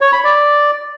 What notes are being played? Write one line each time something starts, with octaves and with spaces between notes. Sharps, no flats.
C#5
B5
D5